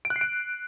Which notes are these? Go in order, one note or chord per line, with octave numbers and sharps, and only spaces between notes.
D7
F#6
C7
D7